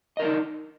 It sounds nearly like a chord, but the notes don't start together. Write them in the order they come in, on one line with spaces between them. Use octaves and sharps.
D#5 A#4 D4 D#4